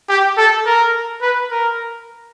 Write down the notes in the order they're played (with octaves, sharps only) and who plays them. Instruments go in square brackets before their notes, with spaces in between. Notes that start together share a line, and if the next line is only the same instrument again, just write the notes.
[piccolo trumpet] G4
A4
A#4
B4
A#4